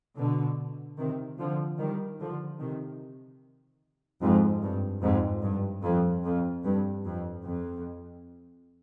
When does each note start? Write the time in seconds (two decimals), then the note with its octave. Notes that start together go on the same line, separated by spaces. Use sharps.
0.18 B2 D3
0.98 C3 D#3
1.38 D3 F3
1.78 D#3 G3
2.20 D3 F3
2.60 C3 D#3
4.21 F2 G#2
4.61 G2
5.02 F2 G#2
5.42 G2
5.83 F2
6.23 F2
6.63 G2
7.05 F2
7.44 F2